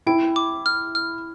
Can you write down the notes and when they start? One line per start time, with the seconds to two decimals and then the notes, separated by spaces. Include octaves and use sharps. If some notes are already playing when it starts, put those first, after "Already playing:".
0.07 E4 G5
0.36 D6
0.66 F6
0.95 F6